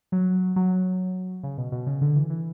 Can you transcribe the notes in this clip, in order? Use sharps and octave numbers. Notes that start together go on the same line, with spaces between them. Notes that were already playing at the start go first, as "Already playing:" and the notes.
F#3
F#3
C#3
B2
B2
C#3
D3
E3
E3